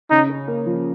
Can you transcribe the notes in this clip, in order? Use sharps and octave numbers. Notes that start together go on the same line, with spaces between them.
C#3 D#4
C#4
A#3
F3